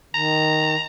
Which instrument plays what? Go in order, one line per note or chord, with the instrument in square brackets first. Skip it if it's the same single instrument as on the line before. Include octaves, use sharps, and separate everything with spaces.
[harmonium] D#3 [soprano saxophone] A#5